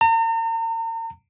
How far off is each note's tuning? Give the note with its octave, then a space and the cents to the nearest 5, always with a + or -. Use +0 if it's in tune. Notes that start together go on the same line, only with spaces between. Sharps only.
A#5 -40